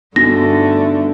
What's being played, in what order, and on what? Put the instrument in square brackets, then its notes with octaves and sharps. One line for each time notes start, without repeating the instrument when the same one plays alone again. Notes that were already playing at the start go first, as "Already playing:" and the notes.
[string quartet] G2 D3 A3 [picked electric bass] B3 D4 [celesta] D#4 F#4 [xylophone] A#6